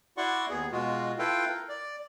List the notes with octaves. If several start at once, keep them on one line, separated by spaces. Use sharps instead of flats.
E4 F#4 D5 F#5 C6 C#6
D#2 B3 G#4
B2 G#3 F4 F#4
E4 F4 A4 B4 F5 G5
A#4
D5